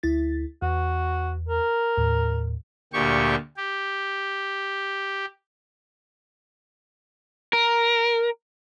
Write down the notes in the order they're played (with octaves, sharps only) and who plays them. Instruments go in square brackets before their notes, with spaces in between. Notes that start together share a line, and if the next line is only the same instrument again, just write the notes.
[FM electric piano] D2 E4 A6
[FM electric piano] E2 [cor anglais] F#4
[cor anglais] A#4
[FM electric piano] D#2 A2
[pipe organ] D2 A#2 G4 C#6
G4
[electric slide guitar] A#4